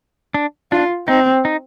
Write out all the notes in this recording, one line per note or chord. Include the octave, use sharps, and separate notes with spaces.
D4
D4 F4
C4 D#4
D#4